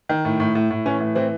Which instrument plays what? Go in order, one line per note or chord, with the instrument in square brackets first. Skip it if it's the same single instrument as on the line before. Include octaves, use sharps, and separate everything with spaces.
[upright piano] D#3
A2
A2
A2
A2
E3 C#4
A2
E3 C4